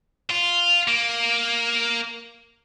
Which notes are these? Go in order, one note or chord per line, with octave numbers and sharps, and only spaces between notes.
F4
A#3